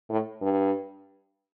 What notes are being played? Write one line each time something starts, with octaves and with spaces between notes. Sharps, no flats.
A2
G2